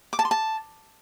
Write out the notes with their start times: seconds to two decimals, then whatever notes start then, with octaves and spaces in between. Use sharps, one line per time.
0.13 D6
0.19 A5
0.25 C6
0.31 A5